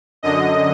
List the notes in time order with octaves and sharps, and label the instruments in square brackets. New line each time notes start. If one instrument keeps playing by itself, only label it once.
[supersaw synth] F#2 D3 D#5